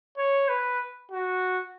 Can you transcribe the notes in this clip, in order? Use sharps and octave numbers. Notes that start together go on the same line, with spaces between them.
C#5
B4
F#4